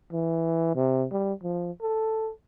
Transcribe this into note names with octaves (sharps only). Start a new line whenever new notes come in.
E3
C3
G3
F3
A4